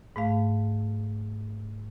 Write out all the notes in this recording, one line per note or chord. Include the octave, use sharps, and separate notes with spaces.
G#2 A3 F5